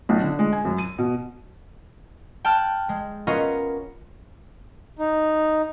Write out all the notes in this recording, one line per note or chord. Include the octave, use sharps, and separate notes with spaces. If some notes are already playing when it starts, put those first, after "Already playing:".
B1
D3
G#3
G#5
F#2
D#7
B2
G5 A5 F6 F#6
G#3
B3 C#4 F4 A#4 D#5
D#4